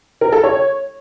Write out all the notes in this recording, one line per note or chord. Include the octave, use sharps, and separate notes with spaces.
A#4
A4
C#5